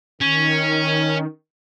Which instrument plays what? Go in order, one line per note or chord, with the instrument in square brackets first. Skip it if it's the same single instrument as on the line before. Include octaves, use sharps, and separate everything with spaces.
[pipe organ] D#3 [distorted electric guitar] C#4